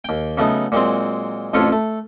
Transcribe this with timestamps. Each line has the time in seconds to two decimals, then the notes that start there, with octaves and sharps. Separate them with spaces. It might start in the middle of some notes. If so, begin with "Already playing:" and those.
0.04 D#2 G5
0.38 C#3 F#3 A3 B3 D#4
0.72 A#2 F#3 G#3 C4
1.54 A1 F2 F4 A4 C#5
1.72 A3